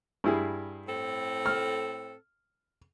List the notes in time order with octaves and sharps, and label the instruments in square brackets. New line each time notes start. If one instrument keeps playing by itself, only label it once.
[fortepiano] G2 E4 G#4
[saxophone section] A2 C4 A4
[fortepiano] F6